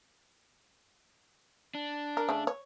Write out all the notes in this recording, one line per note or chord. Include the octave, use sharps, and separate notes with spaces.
D4
A#4
C#3 A3
C#5